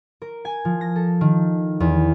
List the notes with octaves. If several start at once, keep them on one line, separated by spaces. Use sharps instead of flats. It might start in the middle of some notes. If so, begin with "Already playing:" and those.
A#4
G#5
F3
A#6
A4
D#3
E2